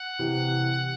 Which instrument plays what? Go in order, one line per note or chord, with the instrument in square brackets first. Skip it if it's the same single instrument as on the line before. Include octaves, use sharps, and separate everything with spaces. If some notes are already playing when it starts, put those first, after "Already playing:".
Already playing: [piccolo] F#5
[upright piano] C3 E3